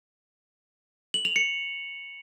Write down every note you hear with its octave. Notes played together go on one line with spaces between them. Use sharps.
F#7
F7
C#7